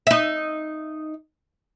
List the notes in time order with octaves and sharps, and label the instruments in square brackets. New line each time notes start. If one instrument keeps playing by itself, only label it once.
[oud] D#4 E5